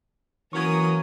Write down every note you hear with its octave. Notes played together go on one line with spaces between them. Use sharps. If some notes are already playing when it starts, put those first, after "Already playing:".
E3 F#3 A#3 C#4 A#4 C#6 D#6 G#6